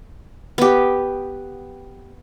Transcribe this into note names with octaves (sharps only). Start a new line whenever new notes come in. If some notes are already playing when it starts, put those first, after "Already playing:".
B3 G4